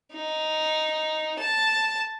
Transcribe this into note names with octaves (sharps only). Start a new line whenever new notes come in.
D#4
A5